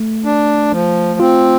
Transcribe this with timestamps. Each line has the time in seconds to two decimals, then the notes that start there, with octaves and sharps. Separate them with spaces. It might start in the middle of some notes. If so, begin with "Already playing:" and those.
Already playing: A3
0.25 D4
0.72 F3
1.20 C4 F4